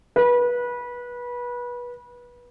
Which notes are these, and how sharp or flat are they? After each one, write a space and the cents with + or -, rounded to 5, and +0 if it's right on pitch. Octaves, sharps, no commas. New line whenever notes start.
B4 -25